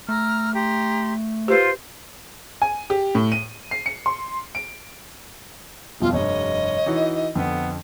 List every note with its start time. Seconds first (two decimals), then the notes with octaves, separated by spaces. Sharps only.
0.09 A3 A#5 E6 F6
0.54 G4 A#5 C6
1.48 F4 G4 B4 C5
2.62 G#5
2.90 G4
3.15 A2
3.32 D#7
3.71 C7
3.86 C#7
4.06 C6
4.55 D7
6.00 D#1 F2 B2 F4
6.13 F1 G2 C#5 D#5
6.86 E3 D#4 F#4
7.35 F2 D3 B3